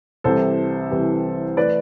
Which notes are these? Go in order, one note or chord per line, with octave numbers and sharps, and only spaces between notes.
C2 C3 E3 G3 A4 C5
C2 C3 E3 G3
E3 A3 B4 D5